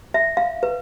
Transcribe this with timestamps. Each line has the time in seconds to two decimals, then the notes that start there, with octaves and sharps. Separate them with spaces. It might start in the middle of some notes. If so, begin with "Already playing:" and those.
0.14 E5
0.37 F5
0.63 B4